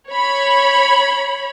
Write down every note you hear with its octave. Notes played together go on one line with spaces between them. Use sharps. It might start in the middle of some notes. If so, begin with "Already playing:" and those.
C#5 B5